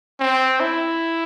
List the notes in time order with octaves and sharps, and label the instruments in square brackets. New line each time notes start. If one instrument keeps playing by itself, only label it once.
[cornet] C4
E4